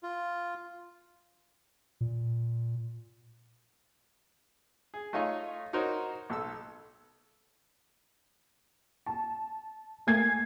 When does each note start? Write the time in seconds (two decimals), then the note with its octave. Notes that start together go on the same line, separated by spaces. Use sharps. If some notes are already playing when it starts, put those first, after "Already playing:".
0.03 F4
2.01 A#2
4.94 G#4
5.13 A3 D#4 F4 C#5 D#5
5.73 D#4 F#4 A#4 C5 C#5
6.30 B1 A4 E6
9.06 A5
10.07 A3 A#3 G#5 G#6 C7